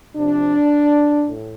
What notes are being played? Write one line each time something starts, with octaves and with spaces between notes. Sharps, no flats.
C3 F3 D4
A2